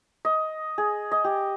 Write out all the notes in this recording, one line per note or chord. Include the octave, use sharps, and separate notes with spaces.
D#5
G#4
D#5
G4